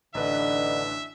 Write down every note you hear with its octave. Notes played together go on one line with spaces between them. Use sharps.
A1 D3 D4 D#4 B4 E5